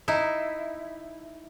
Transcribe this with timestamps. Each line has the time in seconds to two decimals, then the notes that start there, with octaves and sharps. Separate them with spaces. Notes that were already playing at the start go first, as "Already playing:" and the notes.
0.08 D#4 E4